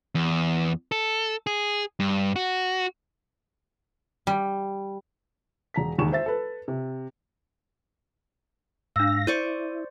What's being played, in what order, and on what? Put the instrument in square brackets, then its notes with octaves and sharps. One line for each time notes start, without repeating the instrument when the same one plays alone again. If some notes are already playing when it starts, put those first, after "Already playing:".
[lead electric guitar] E2
A4
G#4
G2
F#4
[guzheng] G3
[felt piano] E1 A#5 B6
E1 D#2 C#6 E7
C5 E5 A6
A4 B4
C3
[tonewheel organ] G#2 F5 A#6 [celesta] D4 E6
[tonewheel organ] E4 [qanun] C5 D5 C#6 [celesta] D#7